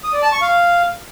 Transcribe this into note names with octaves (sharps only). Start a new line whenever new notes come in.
D#6
D5
A5
C#6
F5